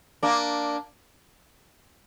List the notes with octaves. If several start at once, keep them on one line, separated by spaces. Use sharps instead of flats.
A#3 D4